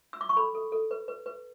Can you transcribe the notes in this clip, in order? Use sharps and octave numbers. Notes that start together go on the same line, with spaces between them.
E6
D6
C#6
A4 B5
A4
A4
B4
B4
B4